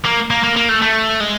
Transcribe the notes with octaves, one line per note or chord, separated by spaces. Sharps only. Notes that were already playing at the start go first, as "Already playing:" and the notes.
A#3
A#3
A#3
A#3
A3
A3
G#3